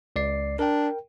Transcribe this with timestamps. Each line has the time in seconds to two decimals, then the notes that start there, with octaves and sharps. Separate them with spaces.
0.16 C#2 D5 C7
0.59 D4 A#4 G5